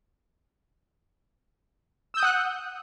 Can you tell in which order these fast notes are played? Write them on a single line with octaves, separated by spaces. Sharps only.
E6 G6 D#6 F#5 F#6